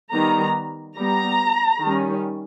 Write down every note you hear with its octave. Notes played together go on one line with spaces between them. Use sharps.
D#3 G3 B3 A#5
G3 B3 A#5
D#3 G3 C#4